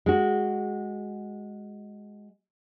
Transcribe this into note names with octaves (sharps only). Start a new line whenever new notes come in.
G#3 F#4